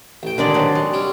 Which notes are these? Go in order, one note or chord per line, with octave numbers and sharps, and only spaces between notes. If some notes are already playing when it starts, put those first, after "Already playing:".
A1 G5
D3 D#3 G#3 D4 D5
C3 F#3
G#3
G3 C#4